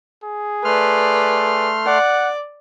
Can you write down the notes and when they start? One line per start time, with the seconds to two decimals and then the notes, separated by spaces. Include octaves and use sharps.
0.24 G#4
0.65 A3 B4 D5 C6 F6
1.87 D5 F#5